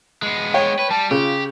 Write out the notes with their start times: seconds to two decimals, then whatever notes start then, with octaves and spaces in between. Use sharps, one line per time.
0.23 G#3 B3
0.54 C#5 G5
0.79 B4 C#5
0.90 G3 A5
1.11 C#3 F4 G4